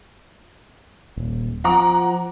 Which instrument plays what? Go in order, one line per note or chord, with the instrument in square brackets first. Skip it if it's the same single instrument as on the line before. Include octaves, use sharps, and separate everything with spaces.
[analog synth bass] D#1
[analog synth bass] F3 [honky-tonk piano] F#5 A#5 D6